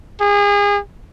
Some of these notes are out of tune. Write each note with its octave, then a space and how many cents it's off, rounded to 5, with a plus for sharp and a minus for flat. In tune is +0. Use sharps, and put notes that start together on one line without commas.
G#4 -35